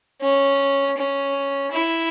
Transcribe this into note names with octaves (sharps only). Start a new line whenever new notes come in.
C#4
C#4
E4